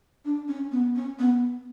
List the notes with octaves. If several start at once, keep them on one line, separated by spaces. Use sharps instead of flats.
D4
C#4
B3
C#4
B3